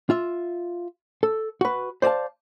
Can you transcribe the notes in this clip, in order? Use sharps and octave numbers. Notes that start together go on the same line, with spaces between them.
F4 E5
A4
F#4 B4
C5 D5 D#5 F5 A5